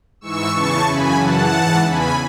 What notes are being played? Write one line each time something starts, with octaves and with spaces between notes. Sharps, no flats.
G#2 E3 C#6 E6
E2 C#3 E3 A5 C#6
F#2 C#3 E3 G#5 B5
F#2 C#3 E3 F#5 A5
G#2 E3
E2 C#3 E3 G#5 B5